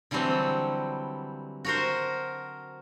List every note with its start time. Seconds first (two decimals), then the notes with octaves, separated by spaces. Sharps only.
0.11 D3 E3 F#3 G3 C4
1.65 F#4 A#4 C5